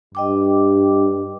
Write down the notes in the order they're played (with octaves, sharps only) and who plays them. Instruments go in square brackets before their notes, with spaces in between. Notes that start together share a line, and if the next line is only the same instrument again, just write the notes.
[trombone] G2 [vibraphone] D#5 G5 D6